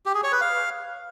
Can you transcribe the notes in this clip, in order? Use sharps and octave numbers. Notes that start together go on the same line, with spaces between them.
G4
G#4
C#5
B4
F5